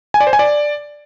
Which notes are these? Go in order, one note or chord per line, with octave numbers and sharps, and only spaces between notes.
G#5
D5
C5
G#5
D5